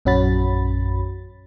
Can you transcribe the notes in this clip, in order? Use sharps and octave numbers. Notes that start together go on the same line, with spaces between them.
A#1 F#2 C#4 F#4 B5 A6